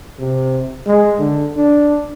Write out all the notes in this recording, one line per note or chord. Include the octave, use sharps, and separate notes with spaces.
C3
G#3
D3
D4